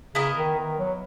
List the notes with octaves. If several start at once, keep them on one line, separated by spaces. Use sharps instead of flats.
C#3 B3 E4 A#4 D#5
D#3
D#3
F#3